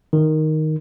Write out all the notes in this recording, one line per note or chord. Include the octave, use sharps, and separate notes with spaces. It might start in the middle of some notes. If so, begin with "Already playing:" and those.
D#3